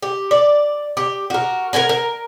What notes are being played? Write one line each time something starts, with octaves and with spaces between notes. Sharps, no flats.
G4
D5
G4
F#4 A#4
A#4 F#5 G#5 A#5
A#4